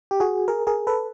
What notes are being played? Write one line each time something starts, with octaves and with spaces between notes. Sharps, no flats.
G4
F#4 G#4
G#4 A#4
G#4 A#4
A4 B4